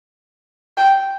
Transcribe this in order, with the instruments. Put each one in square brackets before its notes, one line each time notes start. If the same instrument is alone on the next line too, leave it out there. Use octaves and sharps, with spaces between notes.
[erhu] G5